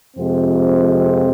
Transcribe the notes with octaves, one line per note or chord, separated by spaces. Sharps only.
F2 C3 F3 G#3 C4